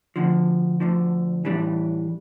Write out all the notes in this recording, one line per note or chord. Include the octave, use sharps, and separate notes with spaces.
D2 D3 F3
D2 D3 F3
A2 E3 G3 D4